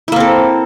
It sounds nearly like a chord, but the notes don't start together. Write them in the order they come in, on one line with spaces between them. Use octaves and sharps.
E4 A#3 C4 A4